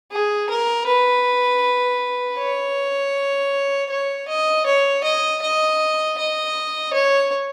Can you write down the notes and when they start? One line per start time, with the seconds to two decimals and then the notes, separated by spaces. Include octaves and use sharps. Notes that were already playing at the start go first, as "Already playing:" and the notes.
0.11 G#4
0.50 A#4
0.87 B4
2.38 C#5
3.90 C#5
4.28 D#5
4.66 C#5
5.04 D#5
5.42 D#5
6.18 D#5
6.94 C#5